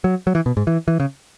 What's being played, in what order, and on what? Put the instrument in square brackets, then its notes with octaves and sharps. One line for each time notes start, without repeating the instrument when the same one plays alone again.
[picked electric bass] F#3
F#3
E3
B2
G#2
E3
E3
C#3